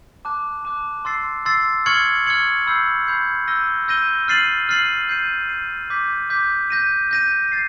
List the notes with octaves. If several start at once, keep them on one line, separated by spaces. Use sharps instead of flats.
A5 D6 F#6
A5 D6 F#6
C6 E6 A6 C7
C6 E6 A6 C7
C#6 F6 G#6 C#7 F#7
C#6 F6 G#6 C#7 F#7
B5 E6 G6 C7
B5 E6 G6 C7
E6 G6 A#6 D#7 G7
E6 G6 A#6 D#7 G7
F6 A6 C7 D#7 F#7
F6 A6 C7 D#7 F#7
G6 C7 D#7
G6 C7 D#7
D6 G6 B6
D6 G6 B6
G6 A#6 D#7
G6 A#6 D#7
A6 C7